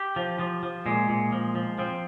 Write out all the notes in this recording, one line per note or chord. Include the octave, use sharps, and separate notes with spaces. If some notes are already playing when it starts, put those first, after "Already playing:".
Already playing: G4
F3
F3
F3
A#2 G#3
A#2
F3
F3
F3 C4